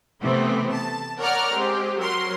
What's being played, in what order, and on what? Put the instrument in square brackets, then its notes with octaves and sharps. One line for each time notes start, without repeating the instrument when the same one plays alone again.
[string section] C3 E3 A3 B3 C4
A5
A#4 C#5 D5 F#5 A#5 F6
G#3 C4 G4
F#3 A#4 C6